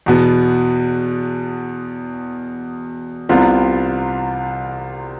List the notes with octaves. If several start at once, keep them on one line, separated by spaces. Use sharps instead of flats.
E2 B2 B3
C2 C3 G3 B3 F4